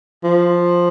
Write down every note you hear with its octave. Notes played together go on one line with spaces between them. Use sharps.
F3